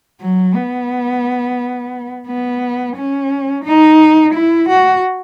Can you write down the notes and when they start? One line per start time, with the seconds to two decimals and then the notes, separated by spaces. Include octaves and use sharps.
0.21 F#3
0.55 B3
2.27 B3
2.96 C#4
3.64 D#4
4.33 E4
4.68 F#4